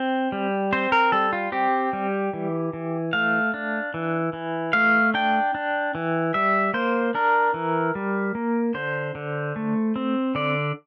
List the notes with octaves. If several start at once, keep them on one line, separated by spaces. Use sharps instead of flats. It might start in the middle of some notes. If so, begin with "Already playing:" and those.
Already playing: C4
G3
C4 C5
A#4
G3 A4
F4
C4 G4
G3
E3
E3
A3 F5
D4
E3
E3
A3 F5
D4 G5
D4
E3
G3 E5
A#3 C5
D4 A#4
E3
G3
A#3
D3 C5
D3
A3
C4
D3 D5